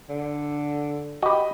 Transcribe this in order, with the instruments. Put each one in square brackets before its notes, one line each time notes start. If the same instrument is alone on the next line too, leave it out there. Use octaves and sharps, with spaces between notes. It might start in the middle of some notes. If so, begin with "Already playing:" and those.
[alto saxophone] D3
[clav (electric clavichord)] F#4 G4 [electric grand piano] D#5 B5